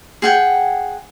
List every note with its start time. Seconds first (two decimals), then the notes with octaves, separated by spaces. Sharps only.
0.22 G#4 F#5 G5